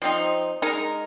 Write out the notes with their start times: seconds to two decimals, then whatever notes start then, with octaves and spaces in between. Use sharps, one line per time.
0.02 F3 C4 D#4
0.62 G#3 D#4 A#4